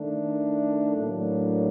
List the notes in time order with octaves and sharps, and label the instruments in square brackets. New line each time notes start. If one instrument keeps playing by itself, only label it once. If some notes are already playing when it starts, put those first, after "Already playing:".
Already playing: [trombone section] D#3 A3 D4
A2 F#3 A#3 D4